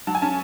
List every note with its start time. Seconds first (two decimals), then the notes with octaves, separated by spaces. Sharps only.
0.07 F#3 A5
0.15 G#5
0.22 C#4 A5